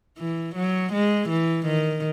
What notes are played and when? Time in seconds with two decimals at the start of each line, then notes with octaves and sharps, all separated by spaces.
0.18 E3
0.55 F#3
0.93 G#3
1.29 E3
1.66 D#3